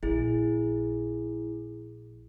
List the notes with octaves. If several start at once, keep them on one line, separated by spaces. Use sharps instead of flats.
A#1 E4 G#4